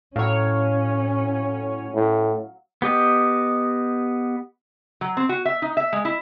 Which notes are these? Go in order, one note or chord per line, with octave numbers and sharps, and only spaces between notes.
A2 F#3 C#4 C#5 F5
A2
B3 G4 D#5
F#3
C4
F#4
E5
D#4
E5
G#3
E4